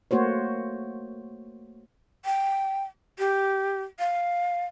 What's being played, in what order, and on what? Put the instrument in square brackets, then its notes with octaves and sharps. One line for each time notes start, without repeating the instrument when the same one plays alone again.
[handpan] A3 A#3 F#4 C5 C#5
[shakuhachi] G5
G4
F5